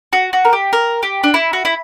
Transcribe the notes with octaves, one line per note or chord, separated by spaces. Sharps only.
F#4
F#4
A#4
G4
A#4
G4
D4
E4
F#4
E4